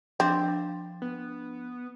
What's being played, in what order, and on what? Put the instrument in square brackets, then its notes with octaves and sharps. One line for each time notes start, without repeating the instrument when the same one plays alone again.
[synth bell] F3 D4 [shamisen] C4
[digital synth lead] B3